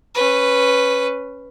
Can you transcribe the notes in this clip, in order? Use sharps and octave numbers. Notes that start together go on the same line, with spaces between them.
C#4 B4